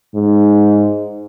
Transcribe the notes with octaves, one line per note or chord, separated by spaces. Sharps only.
G#2